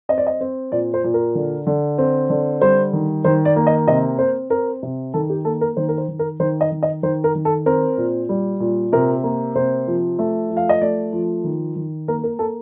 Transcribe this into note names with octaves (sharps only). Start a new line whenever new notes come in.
C4 D#5
D5
D#5
C4
A#2 D5
C5
A#2
A#4
D3
D3
C4
D3
G3 C5
D#3
D#3 C5
D5
A#3
D#5
C3 D#5
C4 C5
C4 A#4
C3
D#3 A4
G4
A#3 A4
A#4
D#3 C5
A#4
C5
D#3
A#4
D#3 C5
D#5
D#3
D#5
D#3 C5
A#4
D#3
A4
C4 A#4
A#2
G3
A#2
C3 A#4
A#3
C3 C5
F3
A3
F3
F5
D#5
A3 D5
F3
D#3
D#3
A#3 A#4
A#4
A#3 A4